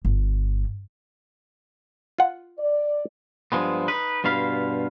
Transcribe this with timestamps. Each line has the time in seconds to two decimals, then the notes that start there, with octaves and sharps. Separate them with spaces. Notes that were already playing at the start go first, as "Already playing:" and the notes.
0.05 G1
2.18 F4 F#5
2.59 D5
3.52 G2 F3 G#3 B3
3.88 D#4 B4
4.24 G2 B2 F4 F5 B5